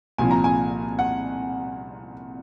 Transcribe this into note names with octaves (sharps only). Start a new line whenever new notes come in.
C2 A#2 F3 G#5
A#5
G#5
F#5